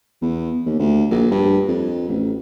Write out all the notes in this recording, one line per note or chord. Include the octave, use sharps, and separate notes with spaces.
E2
D#2
D2
A#1
G2
F2
A1